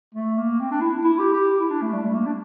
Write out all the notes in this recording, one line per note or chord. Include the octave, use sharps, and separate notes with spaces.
A3
A#3
C4
D4
E4
E4
G4
G4
E4
D4
A3
G3
A3
A#3
D4